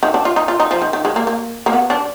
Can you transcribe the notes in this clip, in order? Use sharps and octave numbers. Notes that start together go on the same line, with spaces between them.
D#3
D4
F4
D#4
F4
D#4
F3
D#3
D#3
G#3
A#3
A#3
A#3
B3
D4